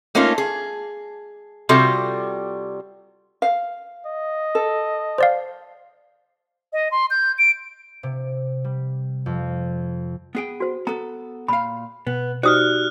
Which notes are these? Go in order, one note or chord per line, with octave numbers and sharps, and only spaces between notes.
A3 A#3 C#4 D#4 F4
G#4
C3 G3 F4 F#4 A4
F5
D#5
A4
C5 D5 F5
D#5
C6
G6
D7
C3
G3
F2
B3 G#4 G5
F#4 C5
B3 A4 A#5
A#2 F5 B5
B2 B3
D#4 F#4 G4 C5 D5 D#6 F6 F#6